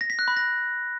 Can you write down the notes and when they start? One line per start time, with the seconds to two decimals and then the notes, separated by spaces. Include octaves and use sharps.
0.01 A#6
0.10 B6
0.19 F#6
0.28 B5
0.37 A#6